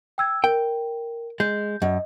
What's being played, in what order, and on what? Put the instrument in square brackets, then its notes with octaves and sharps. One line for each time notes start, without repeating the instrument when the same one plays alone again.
[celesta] G5 E6 G#6
[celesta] A#4 [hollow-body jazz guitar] G5
[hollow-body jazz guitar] G#3 [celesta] G6
[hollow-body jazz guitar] F#2 [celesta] D#5